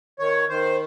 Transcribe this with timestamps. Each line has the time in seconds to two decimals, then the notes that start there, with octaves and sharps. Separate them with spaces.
0.19 D#3 C#5
0.49 D#3 C5